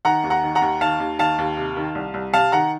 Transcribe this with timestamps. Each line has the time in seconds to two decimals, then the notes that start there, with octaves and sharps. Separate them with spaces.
0.05 D#3 F#5 A#5
0.24 D#2
0.30 F#5 A#5
0.44 D#3
0.55 F#5 A#5
0.62 D#2
0.81 D#3 F5 A5
1.00 D#2
1.19 D#3 F5 A5
1.39 D#2
1.57 C3
1.77 D#3
1.95 C2
2.14 C2
2.33 C3 F5 A5
2.52 D#3 F#5 A#5